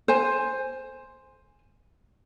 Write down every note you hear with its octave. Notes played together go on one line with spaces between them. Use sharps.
C5 G#5